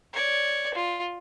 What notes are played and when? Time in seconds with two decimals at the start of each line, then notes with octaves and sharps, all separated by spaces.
0.13 C#5 D5
0.74 F4